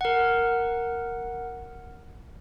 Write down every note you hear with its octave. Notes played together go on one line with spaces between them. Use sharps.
A#4 F#5